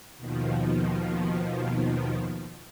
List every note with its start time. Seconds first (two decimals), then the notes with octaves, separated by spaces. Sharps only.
0.17 D#2 B2 D#3 F3